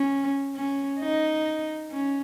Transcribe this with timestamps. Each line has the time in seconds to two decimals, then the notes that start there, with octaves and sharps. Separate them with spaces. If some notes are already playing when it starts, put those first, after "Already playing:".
Already playing: C#4
0.55 C#4
1.00 D#4
1.92 C#4